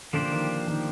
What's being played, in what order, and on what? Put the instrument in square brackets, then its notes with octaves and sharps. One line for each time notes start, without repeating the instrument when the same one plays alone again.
[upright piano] D3 [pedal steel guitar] F3 A#3 D4 G4 C5
[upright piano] D#3
D#3